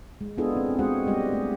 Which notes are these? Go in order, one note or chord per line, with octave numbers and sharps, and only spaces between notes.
G#3
B3 D4 E4 F4 G#4 A4
C4
G#3 F4 F#4 G#4 C5 F#5
G3 G#3 B3 G4 D#5
A3 G#4